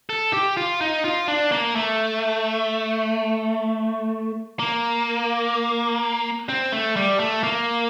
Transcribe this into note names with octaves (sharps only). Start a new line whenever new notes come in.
A4
G4
F4
D#4
F4
D4
A#3
A3
A#3
C4
A3
G3
A3
A#3